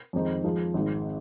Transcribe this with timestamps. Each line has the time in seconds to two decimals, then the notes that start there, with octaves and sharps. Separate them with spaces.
0.13 F2 D#3 G#3 C4 D#4
0.44 F2 F3 G#3
0.74 G#1 G#2 G#3 C4